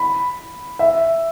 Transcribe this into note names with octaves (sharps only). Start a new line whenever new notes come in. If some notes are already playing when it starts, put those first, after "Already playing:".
Already playing: B5
E5